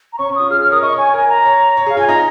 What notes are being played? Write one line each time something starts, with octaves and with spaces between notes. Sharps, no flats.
A#5
C#4 C#6
C#4
F4 D#6
G#4 F6
F6
C#5
A#4 D#6
D#5 C#6
C#5
G#5
A#4 G#5
A#5
C#5
C#5
G#4
F5
F4 G#5
D#4 A#5